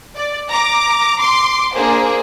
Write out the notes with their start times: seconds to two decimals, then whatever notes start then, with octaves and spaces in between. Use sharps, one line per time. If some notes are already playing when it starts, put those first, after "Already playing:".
0.16 D5
0.49 A#5 D6
1.19 C6 D6
1.75 A#3 D4 G#4 C5